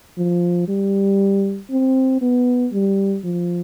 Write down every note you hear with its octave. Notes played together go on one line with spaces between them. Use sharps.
F3
G3
C4
B3
G3
F3